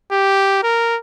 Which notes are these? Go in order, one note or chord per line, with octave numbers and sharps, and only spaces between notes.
G4
A#4